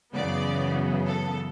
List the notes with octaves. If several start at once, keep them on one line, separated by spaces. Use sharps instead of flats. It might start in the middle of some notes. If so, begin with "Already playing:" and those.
F#2 C#3 E3 B3 D5
A4